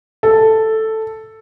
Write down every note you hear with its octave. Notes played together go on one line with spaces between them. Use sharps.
A4